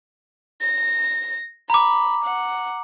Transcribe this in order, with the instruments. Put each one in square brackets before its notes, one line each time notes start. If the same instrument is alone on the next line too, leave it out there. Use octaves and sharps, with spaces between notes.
[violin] A#6
[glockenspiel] A#5 D6 [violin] B5
[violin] F#5